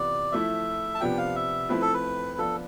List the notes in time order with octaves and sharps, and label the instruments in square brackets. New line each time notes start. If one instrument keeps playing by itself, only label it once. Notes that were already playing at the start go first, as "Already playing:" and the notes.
Already playing: [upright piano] C3 E3 B3 F4 [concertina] D5
[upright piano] F3 A3 E4 [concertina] E5
[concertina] A5
[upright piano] C3 F3 B3 D4 [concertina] G5
[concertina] F5
E5
[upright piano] F3 A3 C4 E4 [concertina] B4
[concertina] A4
B4
[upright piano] F3 B3 D4 F4 [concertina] A4